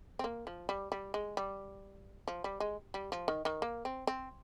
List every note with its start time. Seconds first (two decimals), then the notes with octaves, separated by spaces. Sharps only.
0.19 C4
0.24 A#3
0.47 F3
0.69 G3
0.92 G3
1.14 G#3
1.37 G3
2.28 F3
2.44 G3
2.60 G#3
2.94 G3
3.12 F3
3.28 D#3
3.45 D#3
3.62 A#3
3.85 C4
4.07 C4